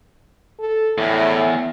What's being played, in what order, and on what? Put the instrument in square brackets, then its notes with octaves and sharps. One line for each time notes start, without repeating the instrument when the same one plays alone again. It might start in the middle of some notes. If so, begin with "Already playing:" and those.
[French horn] A4
[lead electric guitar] E2 [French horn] A2